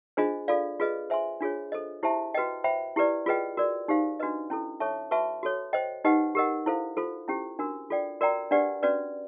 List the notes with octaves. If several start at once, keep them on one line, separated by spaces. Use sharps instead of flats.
D4 F4 G#4 C5 D#5
F4 A4 D5 F5
F4 G#4 B4 D#5
C5 E5 G#5 C6
D4 F4 G#4 C#5
A4 C5 D#5
E4 G4 C5 E5 A5
F#4 B4 D#5 G5
C5 E5 G5 B5
E4 G4 B4 D5
F4 G#4 B4 D#5 G5
F#4 A#4 D5
D#4 G4 C5 F5
D4 F#4 B4 D#5
C#4 E4 A4
A4 C#5 E5 A5 C#6
F#4 B4 E5 A5 C#6
F#4 A4 C#5
C5 D#5 G5
D#4 G4 B4 D#5 F#5
G4 A#4 D#5 F#5
E4 A4 C5 F5
F4 A4 C5
C#4 E4 G4 C5
D4 F#4 A#4
F4 A4 D5 G5
F#4 A#4 D5 G5 A#5
D4 G4 B4 D5 F#5
C#4 F#4 B4 D5